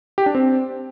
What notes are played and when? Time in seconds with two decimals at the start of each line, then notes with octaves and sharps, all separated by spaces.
0.18 G4
0.26 D4
0.35 C4